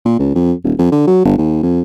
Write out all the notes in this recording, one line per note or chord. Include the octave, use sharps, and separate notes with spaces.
A#2
C#2
F2
D#1
F2
D3
F#3
G1
D#2
F2